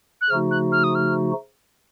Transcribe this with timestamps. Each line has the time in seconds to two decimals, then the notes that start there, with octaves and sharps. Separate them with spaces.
0.21 F#6
0.30 C#3 F3 A3 D#4 F#4 F6
0.51 F#6
0.72 F6
0.84 D#6
0.95 F6